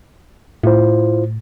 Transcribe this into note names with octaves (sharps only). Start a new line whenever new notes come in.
A2 E4 F4 C5